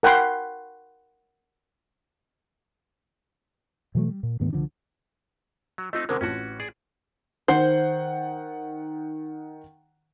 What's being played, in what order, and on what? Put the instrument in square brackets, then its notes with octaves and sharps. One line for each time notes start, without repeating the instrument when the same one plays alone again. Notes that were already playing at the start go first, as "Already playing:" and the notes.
[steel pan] A#4 F#5 G5 B5 C6
[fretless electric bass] B2 E3 F#3 A3
G3
A#2
D2 G#2 D#3 B3
C2 D3 F3 D4
[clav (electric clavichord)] F#3
[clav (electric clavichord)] A3 C4 D#4 [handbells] F4 D#5
[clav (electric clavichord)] B2 D3 G#3 [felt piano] C4 A#4
[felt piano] A1 [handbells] C4 F4 A5 [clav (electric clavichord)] C#4 F#4
[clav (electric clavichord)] G#4 D5
[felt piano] D#3 F#5 G6 [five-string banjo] C5